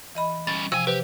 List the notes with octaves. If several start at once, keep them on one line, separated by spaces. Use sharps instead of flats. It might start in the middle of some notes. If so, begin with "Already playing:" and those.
E3 D#5 B5
G3 C#4 A6
C3 F3 F#4 G5 G#5 E6
G4 B4 C5